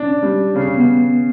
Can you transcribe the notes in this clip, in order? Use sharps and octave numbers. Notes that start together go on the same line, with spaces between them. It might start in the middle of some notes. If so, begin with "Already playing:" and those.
Already playing: C#4 D4
G3
C#3 C#4
B3